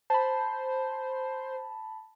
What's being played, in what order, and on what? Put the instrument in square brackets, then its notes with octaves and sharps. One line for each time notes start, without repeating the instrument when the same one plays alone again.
[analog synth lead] C5 [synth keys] A5 B5